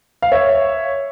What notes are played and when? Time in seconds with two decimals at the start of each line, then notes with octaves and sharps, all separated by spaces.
0.22 F5
0.32 C#5 E5